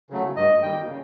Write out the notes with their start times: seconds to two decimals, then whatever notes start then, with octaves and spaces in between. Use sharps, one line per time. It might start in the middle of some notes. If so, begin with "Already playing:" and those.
0.10 C#3 F#3 A3
0.36 G2 D#5
0.62 D#3 G3 A#3 G5
0.88 C#3